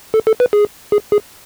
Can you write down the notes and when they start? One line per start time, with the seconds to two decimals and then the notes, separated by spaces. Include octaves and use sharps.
0.14 A4
0.27 A4
0.40 B4
0.53 G#4
0.92 G#4
1.12 G#4